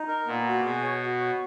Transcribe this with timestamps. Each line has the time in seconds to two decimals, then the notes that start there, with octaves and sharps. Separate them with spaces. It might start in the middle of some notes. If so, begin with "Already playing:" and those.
Already playing: D#4
0.08 A#4
0.27 A#2 B3
0.46 F#4
0.64 B2 G#4
0.83 C#5
1.01 F#4
1.20 C#5